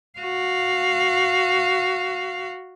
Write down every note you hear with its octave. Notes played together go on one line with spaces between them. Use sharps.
F#4 F5